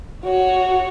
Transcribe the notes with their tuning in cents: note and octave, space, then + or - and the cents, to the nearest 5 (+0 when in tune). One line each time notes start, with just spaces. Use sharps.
F#4 +0 C#5 +0